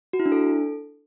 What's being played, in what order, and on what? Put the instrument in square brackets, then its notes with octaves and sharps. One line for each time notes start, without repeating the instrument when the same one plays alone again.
[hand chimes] F#4
E4
D4
A4